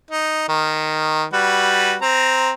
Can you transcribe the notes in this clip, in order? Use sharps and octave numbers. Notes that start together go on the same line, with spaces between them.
D#4
D#3
G3 F#4 B4
C4 A#5